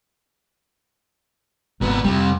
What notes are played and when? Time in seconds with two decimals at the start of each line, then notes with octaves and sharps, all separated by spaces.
1.81 G#1 A#2 B3
2.04 F2 C3 G3